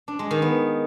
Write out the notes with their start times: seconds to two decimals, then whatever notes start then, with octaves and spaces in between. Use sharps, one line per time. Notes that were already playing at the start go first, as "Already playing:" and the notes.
0.08 D4
0.19 G#3
0.31 D#3
0.42 B3